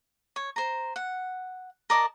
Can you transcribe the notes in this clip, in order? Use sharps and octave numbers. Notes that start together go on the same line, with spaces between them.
C#5
C5 A#5
F#5
A#4 D5 D#5 A5